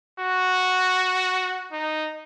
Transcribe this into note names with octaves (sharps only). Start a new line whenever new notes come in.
F#4
D#4